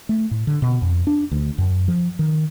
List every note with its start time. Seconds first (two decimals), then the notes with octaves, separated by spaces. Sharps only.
0.09 A3
0.31 A2
0.47 D3
0.62 B2
0.82 F2
1.07 D4
1.31 D2
1.58 F#2
1.88 F3
2.19 D#3